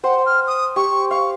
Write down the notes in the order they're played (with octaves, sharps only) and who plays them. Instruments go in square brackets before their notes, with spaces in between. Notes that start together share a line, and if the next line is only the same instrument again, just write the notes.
[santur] C5 G5 [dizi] F#5
[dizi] F6
D#6
[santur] G4 [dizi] C#6
[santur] F5 [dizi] C#6